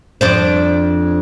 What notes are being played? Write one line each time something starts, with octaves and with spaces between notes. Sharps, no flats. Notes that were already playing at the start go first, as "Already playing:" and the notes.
F2 D4 C5